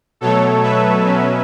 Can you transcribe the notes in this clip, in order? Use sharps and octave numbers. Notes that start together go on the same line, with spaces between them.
B2 F#3 A3 A4 C#5
B4 E5
B2 F#3 C#4